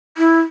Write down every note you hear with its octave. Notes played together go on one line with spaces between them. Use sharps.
E4